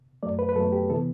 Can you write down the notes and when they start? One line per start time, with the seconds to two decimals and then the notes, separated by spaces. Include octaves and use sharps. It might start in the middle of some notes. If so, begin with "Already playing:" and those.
0.23 F#2 F#3 A3 D5
0.39 B4
0.49 B4
0.56 F#2 F#3 A3 A4
0.72 G4
0.90 C3 E3 B3 A4